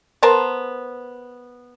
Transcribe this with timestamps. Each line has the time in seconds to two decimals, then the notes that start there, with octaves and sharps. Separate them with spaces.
0.23 B3 A#4 C5 A5